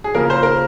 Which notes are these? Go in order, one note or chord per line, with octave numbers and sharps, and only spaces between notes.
G#4
C#3 F3 A#3 A#4
C5
A#4